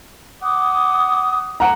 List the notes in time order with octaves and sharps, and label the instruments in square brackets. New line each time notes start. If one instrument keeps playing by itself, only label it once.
[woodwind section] F#5 D6 D#6
[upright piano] F#5 A#5